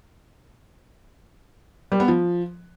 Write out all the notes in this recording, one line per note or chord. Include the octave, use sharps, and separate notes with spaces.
G3
B3
F3